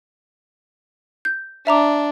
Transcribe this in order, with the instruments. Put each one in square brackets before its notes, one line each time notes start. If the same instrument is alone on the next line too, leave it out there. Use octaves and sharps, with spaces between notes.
[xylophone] G6
[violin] D4 [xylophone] E5 A#5 D6